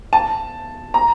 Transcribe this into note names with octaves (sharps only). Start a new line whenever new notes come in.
A5
A#5